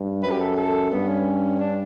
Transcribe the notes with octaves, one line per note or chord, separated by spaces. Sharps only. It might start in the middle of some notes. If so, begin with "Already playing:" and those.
Already playing: G2
F#2 B4
G4
A4
A4
G2 B3
C#4
D4